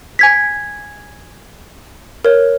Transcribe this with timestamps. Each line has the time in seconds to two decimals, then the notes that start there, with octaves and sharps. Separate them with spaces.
0.19 G#5 G#6 B6
2.25 A#4 C#5